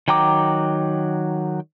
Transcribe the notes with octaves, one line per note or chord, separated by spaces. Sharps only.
D#3 F#3 G5 A#5 D6